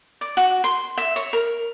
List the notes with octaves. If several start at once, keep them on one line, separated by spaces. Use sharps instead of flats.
D5
F#4
C6
E5
C#5
A#4